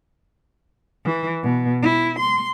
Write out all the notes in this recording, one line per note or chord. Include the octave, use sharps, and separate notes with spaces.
E3
B2
E4
C6